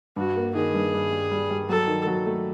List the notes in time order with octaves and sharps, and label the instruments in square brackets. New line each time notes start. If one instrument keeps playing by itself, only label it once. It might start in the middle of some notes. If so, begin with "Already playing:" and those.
[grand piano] G2 [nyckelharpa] F#4
[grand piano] A#3
[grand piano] D#3 [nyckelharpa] G#4
[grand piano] G2
G2
G3
G3
G3
[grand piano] F#3 [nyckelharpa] A4
[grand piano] D#3
F#3
A3